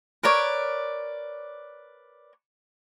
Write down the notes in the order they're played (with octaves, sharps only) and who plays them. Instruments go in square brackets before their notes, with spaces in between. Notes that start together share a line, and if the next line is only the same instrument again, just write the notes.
[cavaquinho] A#4 B4 C#5 D5